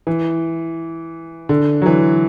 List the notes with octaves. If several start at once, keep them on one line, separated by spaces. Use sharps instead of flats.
E3
D3
F#3
E3